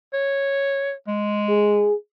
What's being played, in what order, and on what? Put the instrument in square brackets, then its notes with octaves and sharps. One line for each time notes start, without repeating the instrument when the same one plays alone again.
[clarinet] C#5
G#3
[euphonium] G#4